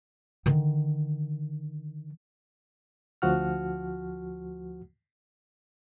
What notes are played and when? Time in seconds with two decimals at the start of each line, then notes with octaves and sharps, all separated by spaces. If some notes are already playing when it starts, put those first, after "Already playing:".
0.46 D3 D#3
3.22 D2 F3 F#4 F#5 F6